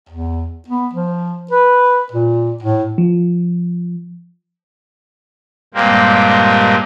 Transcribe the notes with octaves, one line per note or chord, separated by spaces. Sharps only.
E2
B3
F3
B4
A#2
A2
F3
G2 A#2 G#3 A#3 C4 G4